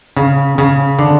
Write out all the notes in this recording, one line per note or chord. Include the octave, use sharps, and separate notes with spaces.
C#3
C#3
D3